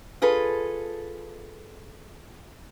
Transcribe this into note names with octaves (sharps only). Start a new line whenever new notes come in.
F4 G#4 A4 B4